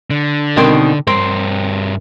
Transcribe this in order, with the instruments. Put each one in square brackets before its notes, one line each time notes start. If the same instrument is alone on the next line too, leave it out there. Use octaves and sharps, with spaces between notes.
[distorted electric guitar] D3
[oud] B2 D#3 C4
[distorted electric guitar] G2 A#4 [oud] C4